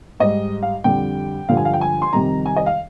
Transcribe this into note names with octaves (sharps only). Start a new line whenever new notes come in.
G#2 G3 D#5
F5
F2 D3 G3 G5
G2 D3 F3 F5
G#5
F5
G5
G#5
C6
F2 C3 D#3 G3 A#5
G#5
D#5
F5